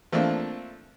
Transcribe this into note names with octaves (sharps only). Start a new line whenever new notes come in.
F3 A3 A#3 C4 D4